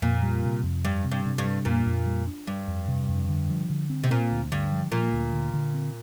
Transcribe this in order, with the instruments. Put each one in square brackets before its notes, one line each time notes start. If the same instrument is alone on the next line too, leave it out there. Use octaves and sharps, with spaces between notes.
[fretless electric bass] F2 [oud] A#2
[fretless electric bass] G3
C3
F2
[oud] G2 [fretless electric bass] G3
[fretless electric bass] C3
[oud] G2
[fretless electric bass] C3
[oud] G2
[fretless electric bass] G3
[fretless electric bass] F2 [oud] A#2
[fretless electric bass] F2
G3
D4
[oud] G2 [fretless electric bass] G3
[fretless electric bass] F2
C3
F2
D3
F3
D3
C4
[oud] C3
[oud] A#2 [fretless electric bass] C4
[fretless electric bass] D2
[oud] G2 [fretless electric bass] D3
[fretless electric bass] F3
[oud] A#2 [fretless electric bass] F3
[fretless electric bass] D2
D3
D3
C4